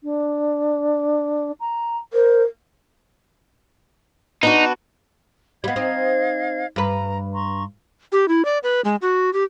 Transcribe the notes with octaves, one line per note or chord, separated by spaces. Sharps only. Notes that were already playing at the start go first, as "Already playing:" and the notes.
D4
A#5
A#4 C5
B3 D4 D#4 F#4
G3 B3 D#5 F5 G#6
C4 D#4
G2 B4 A#5
A#5 C6 C#6
G4
E4
D5
B4
G#3
F#4
G4